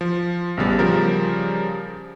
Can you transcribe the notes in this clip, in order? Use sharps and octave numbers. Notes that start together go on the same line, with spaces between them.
F3
A1 C#3 G3 B3 A6
C#3 F3 G3 A#4